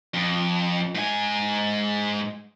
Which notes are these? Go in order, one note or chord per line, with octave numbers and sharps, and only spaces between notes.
F2
G#2 G#5